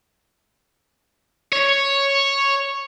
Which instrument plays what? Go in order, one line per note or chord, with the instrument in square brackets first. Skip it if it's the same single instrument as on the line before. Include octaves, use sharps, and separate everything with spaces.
[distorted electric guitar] C#5